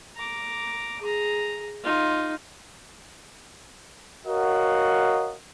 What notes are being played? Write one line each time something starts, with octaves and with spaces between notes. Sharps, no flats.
A#5 D6
G#4 A#5
D#4 F4
F#4 A#4 C#5 D#5 F5 F#5